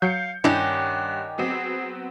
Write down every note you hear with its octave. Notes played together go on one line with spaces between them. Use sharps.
F#3 F5 G6 C#7
G2 D#3 C#4 D4 E4 G4 F#5
F#3 B3 C4 G#4